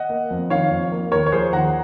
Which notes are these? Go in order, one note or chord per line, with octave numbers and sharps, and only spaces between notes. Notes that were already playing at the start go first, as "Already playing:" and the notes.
Already playing: D#5 F#5
A#3
F2
D#3 C#5 F5
F2
A#3
D#2 A#4 C#5
C#5
F3 G#4 C5
D#2 F#5 A#5